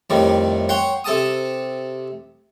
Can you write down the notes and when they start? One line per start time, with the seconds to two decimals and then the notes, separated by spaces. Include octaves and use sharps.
0.10 F2 A2 D#3 G3
0.69 C#5 F#5 G5 C6
1.04 C3 A4 A5 D#6